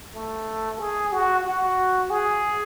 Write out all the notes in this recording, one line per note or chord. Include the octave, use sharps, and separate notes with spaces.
A3
G#4
F#4
F#4
G#4